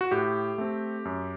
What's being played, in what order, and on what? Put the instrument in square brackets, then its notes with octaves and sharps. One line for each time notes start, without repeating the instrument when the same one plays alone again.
[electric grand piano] F#4
A2 G4
A3 C4
F#2